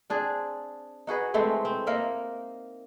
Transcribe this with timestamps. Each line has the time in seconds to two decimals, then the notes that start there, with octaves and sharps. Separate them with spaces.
0.10 C4 D4 G#4
1.07 D#4 F#4 G#4 B4
1.34 E3 G#3 A3 C4
1.65 C4
1.87 A#3 D#4 A#4 E5